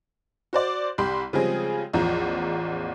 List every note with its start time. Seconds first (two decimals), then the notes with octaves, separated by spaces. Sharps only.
0.53 F#4 C5 D5
0.98 C2 G4 B5 C6
1.33 C#3 F3 G3 G#3 C4 G#4
1.93 A1 E2 F3 A#5